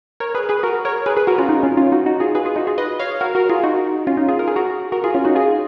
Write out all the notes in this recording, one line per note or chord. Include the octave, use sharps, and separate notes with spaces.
A#4 C#5
G#4 B4
G#4 B4
F#4 A#4
A#4 C#5
G#4 B4
G#4 B4
F#4 A#4
C#4 F4
D#4
C#4 F4
C#4 F4
D#4 F#4
D#4 F#4
F4 G#4
G#4 B4
F4 G#4
D#4 F#4
F4 G#4
B4 D#5
C#5 F5
F#4 A#4
F#4 A#4
F4 G#4
D#4 F#4
C#4 F4
D#4
F4 G#4
A#4
G#4
F#4 A#4
F#4 A#4
F4 G#4
C#4 F4
D#4 F#4
F4 G#4